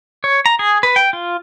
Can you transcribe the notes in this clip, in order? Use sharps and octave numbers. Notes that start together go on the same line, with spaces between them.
C#5
A#5
G#4
B4
G5
F4